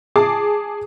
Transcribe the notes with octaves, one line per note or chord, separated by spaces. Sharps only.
G#4 A5 D6